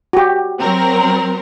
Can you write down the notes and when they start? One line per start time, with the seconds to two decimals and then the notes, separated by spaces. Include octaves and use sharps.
0.13 F#4 G4
0.60 F#3 C4 A#4